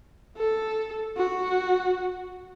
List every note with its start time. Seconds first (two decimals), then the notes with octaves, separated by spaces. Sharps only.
0.37 A4
1.17 F#4